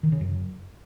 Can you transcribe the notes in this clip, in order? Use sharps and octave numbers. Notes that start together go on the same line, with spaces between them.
D#3
C#3
F#2